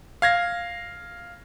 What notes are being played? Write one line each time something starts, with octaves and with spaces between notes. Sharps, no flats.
F5 G#6 A#6